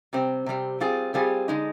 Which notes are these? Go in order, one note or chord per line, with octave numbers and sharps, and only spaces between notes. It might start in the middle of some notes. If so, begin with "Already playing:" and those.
C3 G3 C4
C3 G3 C4
G3 C4 F4 G#4
G3 C4 F4 G#4
D3 G#3 D#4